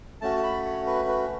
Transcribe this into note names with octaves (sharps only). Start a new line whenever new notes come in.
A3 C#4 F#4 A5
B5
C#5
B4
B4